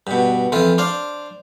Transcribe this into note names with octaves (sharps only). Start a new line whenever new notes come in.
G2 B2
F2 E3 F4
D4 C5 F5